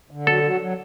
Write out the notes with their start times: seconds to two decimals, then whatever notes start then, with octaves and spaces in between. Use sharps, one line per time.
0.11 D3
0.26 F#3 A4
0.43 F#3
0.61 F#3